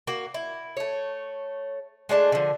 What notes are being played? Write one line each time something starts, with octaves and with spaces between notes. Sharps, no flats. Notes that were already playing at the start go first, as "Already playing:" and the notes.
A#3 F#4
E4
A3 C#5
G#3 A3 D4 A5
D3 F3